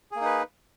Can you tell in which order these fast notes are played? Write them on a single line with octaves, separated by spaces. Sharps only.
G#4 A#3 D#4 B4